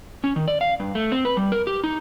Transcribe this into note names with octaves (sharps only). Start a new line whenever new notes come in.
C#4
D#3
D5
F5
G2
A3
C4
B4
G3
A#4
G4
D#4